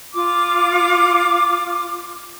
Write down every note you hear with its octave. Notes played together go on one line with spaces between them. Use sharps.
F4 D6